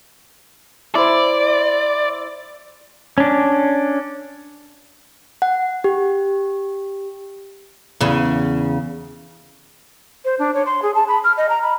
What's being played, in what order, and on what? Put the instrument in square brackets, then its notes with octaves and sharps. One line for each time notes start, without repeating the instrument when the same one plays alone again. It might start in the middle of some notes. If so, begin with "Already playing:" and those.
[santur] E4 C5 [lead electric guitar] D5
[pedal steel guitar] C#4 D4
[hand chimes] F#5
G4
[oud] E2 C#3
[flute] C5
D4
C#5
C6
G#4
A5
B5
F6
D#5
A#5
B5